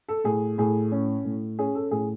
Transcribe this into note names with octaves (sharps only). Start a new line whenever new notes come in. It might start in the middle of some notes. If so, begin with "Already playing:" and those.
A4
A2 G#4
A2 G#4
C#4
A2
C#4 G#4
A4
A2 G#4